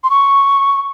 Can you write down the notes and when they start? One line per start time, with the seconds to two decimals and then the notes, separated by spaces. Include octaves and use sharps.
0.04 C6
0.10 C#6